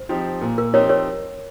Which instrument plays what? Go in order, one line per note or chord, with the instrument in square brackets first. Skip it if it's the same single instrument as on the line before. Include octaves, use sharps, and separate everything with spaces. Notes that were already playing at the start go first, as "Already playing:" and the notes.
Already playing: [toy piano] C5
[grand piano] F3 C4 D#4 G4
A#2
[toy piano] A#4
[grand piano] F3 C4 D#4 G4 [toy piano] A#4 C#5
[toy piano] A#4 C#5